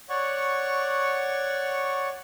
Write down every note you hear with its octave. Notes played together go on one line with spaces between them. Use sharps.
C#5 D5 F#5 C#6